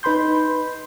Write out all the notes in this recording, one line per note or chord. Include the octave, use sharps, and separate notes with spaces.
D#4 B4 B5 C6 G6